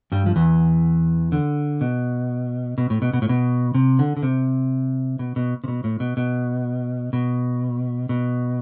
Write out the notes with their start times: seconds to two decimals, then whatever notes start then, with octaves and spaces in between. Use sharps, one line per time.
0.12 G2 G3
0.26 F3
0.36 E2 E3
1.32 D3
1.81 B2
2.78 B2
2.90 A2
3.02 B2
3.13 B2
3.22 A2
3.29 B2
3.74 C3
3.99 D3
4.17 D3
4.23 C3
5.19 B2
5.36 B2
5.64 C3
5.68 B2
5.84 A2
6.00 B2
6.17 B2
7.13 B2
8.09 B2